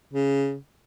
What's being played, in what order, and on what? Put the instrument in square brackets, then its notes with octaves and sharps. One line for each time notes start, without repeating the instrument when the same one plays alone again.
[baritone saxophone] C#3